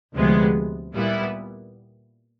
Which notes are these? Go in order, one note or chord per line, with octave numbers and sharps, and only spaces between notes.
D2 C3 F3 G#3 B3
A#2 G3 B3 E4